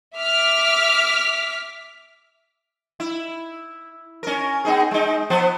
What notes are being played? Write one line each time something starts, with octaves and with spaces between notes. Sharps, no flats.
E5 D6 F6 B6
E4
C#4 A#4
B3 D#4 G#4
G#3 D#4
F3 B3 C5